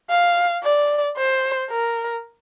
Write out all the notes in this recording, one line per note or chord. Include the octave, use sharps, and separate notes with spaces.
F5
D5
C5
A#4